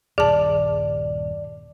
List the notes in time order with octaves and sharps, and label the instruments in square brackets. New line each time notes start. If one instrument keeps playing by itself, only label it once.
[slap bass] D#1 G2 [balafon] G#4 A5 [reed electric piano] D5